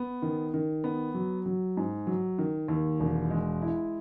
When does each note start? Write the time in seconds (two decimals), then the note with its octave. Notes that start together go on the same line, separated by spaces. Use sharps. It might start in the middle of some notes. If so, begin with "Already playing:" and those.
Already playing: B3
0.22 D#3
0.54 D#3
0.84 B3
1.14 F#3
1.46 F#3
1.77 G#2
2.07 F#3
2.38 D#3
2.68 D#2
3.00 E1
3.30 G#3
3.62 E4